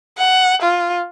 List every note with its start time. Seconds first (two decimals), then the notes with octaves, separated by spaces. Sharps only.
0.18 F#5
0.62 F4